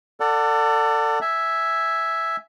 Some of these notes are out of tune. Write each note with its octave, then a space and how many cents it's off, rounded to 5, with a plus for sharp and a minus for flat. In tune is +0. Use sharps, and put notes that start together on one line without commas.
A4 +30 D5 +0 F#5 +0
E5 +0 G#5 +0